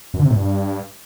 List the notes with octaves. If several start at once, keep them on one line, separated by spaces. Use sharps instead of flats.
F#2
D3
C3
A2
G2